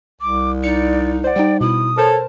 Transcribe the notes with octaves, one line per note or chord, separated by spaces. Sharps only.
C2 D6
D#4 D5 C#7
C5 D5 F#5
G3 D#4 G5
B2 E4 D#6
A4 A#4 C5 C#5 A5